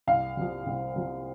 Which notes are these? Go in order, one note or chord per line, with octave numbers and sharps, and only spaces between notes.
C2 F5
C3 F3
C2
C3 F3